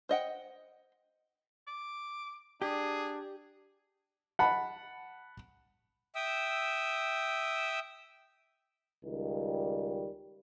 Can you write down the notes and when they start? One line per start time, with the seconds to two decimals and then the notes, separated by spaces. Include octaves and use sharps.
0.09 C5 D#5 F#5 G5
1.67 D6
2.62 D4 G4 G#4
4.39 F#5 A5 B5
6.15 E5 G5 D#6 E6
9.05 C#2 D#3 G3